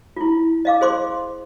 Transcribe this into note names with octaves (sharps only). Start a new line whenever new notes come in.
E4 F4
D#5 F5 D6
G#4 C5 C6 D6